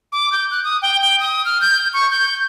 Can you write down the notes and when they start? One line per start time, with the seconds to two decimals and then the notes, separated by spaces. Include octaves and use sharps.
0.12 D6
0.32 G6
0.51 F#6
0.64 D#6
0.82 G5
1.01 G5
1.20 D#6
1.45 F6
1.61 G6
1.94 C#6
2.11 G6